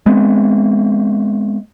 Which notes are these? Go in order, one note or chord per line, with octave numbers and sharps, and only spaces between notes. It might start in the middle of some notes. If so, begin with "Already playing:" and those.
G#3 B3 C4